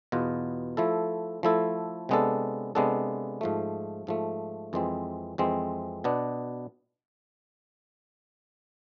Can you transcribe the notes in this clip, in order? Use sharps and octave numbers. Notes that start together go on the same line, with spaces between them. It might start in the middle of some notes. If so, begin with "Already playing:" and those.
E2 B2 B3 F4
F3 A3 E4 A4
F3 A3 E4 A4
C3 G#3 B3 D4 A4
C3 G#3 B3 D4 A4
G#2 F3 A3
G#2 F3 A3
F2 E3 G#3 C4
F2 E3 G#3 C4
B2 B3 D4